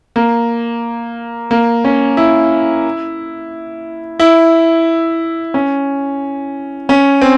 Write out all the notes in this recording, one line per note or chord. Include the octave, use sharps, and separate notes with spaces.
A#3
A#3
C#4
E4
E4
C#4
C#4
C4